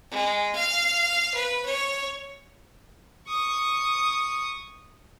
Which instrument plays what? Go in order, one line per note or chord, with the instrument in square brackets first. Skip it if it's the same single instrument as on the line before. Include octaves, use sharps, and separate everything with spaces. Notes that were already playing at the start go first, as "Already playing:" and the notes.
[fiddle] G#3
F5
B4
C#5
[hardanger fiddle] C#6 D#6